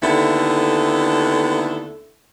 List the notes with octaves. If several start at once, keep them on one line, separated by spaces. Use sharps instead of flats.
D#2 D3 A3 B3 E4 A4